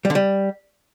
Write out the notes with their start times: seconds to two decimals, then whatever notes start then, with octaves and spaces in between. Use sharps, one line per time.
0.05 G3
0.10 D3
0.15 G3